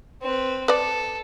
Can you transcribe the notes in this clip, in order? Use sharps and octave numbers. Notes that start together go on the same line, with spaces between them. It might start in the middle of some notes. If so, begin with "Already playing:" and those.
C4 B4
A4 B4 D5